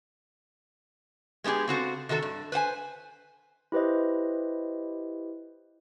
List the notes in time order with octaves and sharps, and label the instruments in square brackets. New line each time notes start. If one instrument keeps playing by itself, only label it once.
[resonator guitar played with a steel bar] G#3 B3 D#4 G4 G#4
C#3 C4 F#4 A4
C3 D#3 F#4 A4
G2
B4 C5 F#5 G#5
[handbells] E4 G4 B4 C5 D#5